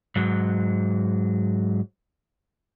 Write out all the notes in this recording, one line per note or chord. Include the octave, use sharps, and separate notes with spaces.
G#2 F#3